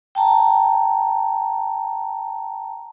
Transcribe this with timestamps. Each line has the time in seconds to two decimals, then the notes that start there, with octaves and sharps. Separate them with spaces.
0.15 G5 A5 A#5